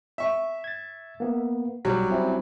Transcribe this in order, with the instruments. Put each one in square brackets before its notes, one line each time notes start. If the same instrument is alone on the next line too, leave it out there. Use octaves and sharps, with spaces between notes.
[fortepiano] E5 C#6
[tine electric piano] G#6 A6
A#3 B3
[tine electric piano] B1 [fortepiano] F#3 G3
[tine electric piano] C4 C#4 E4